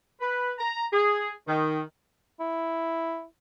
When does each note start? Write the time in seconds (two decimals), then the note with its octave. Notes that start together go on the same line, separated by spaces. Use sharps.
0.21 B4
0.59 A#5
0.93 G#4
1.48 D#3
2.40 E4